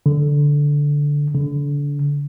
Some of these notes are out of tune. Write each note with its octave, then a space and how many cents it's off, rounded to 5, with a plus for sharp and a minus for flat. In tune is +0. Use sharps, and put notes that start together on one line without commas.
D3 -10
D3 -30